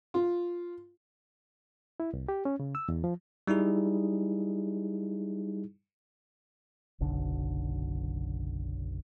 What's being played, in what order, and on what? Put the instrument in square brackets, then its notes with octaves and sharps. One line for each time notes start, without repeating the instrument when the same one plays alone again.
[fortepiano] F4
[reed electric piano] E4
C2
G4
C#4
C#3
E6
E2
F3
[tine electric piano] G3 D#4 E4 G#4
[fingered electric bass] F#1 B1 D3